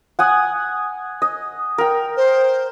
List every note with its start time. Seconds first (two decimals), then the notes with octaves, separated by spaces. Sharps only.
0.19 F#5 G#5 D#6
1.22 D#5
1.78 A#4 G5
2.17 C5